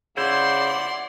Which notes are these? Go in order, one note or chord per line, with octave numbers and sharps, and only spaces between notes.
C#3 E4 C5 D5 F#5 C6